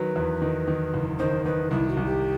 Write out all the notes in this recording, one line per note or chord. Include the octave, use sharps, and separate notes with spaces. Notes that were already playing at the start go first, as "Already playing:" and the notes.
Already playing: D#3 F#3 B4
E2
D#3
D#3
F#1
D#3 C5
D#3 B4
C2 E4
F#4
C2
G4